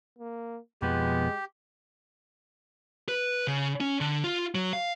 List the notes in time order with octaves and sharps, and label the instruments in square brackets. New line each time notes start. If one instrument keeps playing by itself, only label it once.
[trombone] A#3
[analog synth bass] F2 [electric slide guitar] B2 F3 B3 [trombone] G#3 [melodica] G4
[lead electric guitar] B4
C#3
C#4
D3
F4
F#3
F5